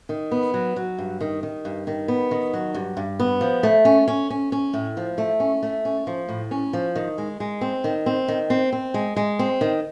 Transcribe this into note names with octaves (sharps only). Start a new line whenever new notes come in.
D#3
B3
F#3
F#3
G2
D#3
D#3
G2
D#3
B3
D#3
F#3
G2
G2
B3
F3
A3
C#4
C#4
C#4
C#4
A2
F3
A3
C#4
A3
C#4
F3
A2
C#4
F3
D#3
G#3
G#3
C4
D#3
C4
D#3
C4
C4
G#3
G#3
C4
D#3